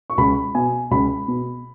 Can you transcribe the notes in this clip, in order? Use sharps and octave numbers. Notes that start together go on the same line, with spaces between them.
C#6
C#2 B5
B2 G#5
C#2 B5
B2